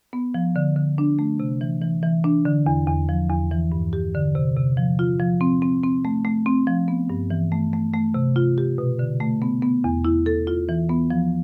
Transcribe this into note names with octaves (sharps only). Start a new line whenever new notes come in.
B3
F3
D3
D3
D4
A3
C3
E3
E3
E3
D4
D3
E2
E2
F3
E2
E3
G2
G4
D3
C3
C3
F3
F4
F3
C4
C4
C4
A3
A3
C4
F3
B3
G2
E3
A3
A3
A3
C3
F4
G4
B2
D3
A3
B3
B3
E2
E4
A4
F4
E3
B3
F3